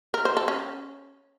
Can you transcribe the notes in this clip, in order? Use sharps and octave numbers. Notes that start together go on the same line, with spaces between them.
A#4
C5
A4
C#4